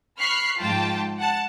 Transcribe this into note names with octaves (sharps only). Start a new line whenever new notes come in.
B5 C#6 F6 F#6 B6 C7
G#2 F3 F4 G5 A5
F#5 A5